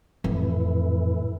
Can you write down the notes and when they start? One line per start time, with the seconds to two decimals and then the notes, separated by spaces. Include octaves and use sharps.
0.24 F2 A2 E3